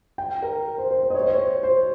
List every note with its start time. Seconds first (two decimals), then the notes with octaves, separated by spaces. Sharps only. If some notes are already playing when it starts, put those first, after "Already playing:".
0.18 G5
0.42 A#4
0.78 C5
0.91 C5
1.03 C5
1.10 D#5
1.14 C#5
1.21 C5
1.27 C#5
1.38 C5
1.63 C5